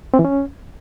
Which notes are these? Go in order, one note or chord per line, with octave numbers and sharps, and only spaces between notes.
C4
E3
C#4